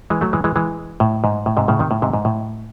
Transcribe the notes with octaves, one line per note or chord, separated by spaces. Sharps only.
E3 G#3
F#3 A3
E3 G#3
E3 G#3
E3 G#3
A2
G#2
A2
G#2 C3
A2 C#3
C3 D#3
A2
G#2 C3
G#2
A2